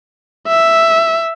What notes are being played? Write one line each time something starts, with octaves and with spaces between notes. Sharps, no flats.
E5